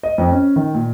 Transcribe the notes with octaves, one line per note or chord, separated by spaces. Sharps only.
D#5
F2
C#4
D#3
A#2